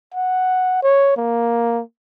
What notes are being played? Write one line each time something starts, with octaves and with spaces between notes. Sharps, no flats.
F#5
C#5
A#3